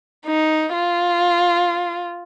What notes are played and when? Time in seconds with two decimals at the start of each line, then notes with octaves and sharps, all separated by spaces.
0.27 D#4
0.74 F4